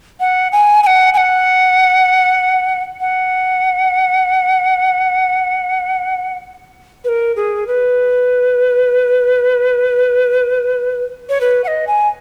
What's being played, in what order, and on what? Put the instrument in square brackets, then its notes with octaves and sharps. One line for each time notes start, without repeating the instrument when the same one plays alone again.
[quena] F#5
G#5
G#5
F#5
G#5
F#5
F#5
B4
A#4
G#4
B4
C#5
B4
F#5
D#5
G#5